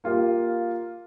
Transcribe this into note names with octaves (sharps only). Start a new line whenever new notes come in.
A#3 F4 G4 F5